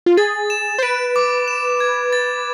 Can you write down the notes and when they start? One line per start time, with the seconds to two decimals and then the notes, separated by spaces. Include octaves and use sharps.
0.06 F4
0.17 G#4 A6
0.50 E7
0.78 C5
0.83 B4 D7
1.16 D6
1.48 E7
1.80 G#6
2.13 A6